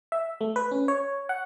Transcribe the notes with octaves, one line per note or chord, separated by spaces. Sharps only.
E5
A3
B4
C#4
C#5
F#5